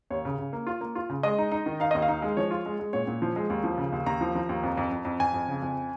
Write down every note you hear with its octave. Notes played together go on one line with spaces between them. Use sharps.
D#2 C#5
C#3
C#3
A#3
F4
A#3
F4
C#3
G#3 D#5
D#4
D#4
D#3
D#4 F5
D#2 D#5
F5
D#4
G#3
F3 C#5
F4
G#3
G#3
A#2 C#5
A#2
F3
G#3
D#2
F3
C#3
D#2
D#2 A#5
F3
F3
D#2
F2
F2
F2
F2
F2 G#5
F2
C#3
F2